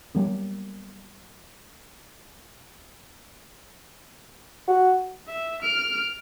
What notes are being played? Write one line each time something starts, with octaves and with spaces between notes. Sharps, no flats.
F#3 G3 A#3 B3
F#4
E5
F6 D7